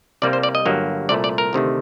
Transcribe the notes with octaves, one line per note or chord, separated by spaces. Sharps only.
C2 C3 G3 A#3 D5
C5
D5
D#5
G1 G2 F#3 A#3
C2 A#2 A3 D5
D5
A#4
D2 C3 D#3 A3